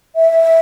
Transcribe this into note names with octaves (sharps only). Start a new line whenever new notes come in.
E5